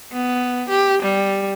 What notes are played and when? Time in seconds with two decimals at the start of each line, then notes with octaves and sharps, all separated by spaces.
0.13 B3
0.69 G4
1.03 G3